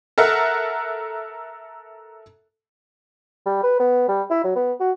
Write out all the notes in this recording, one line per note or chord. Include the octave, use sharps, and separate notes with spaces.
A4 A#4 E5 F#5
G3
B4
B3
G3
E4
F#3
B3
F#4